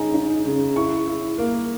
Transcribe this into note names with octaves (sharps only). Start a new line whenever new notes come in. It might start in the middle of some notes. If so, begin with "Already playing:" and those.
Already playing: C#3 D#4 G#5 A#5
D#4
C#3
E4 C#6
E4
A#3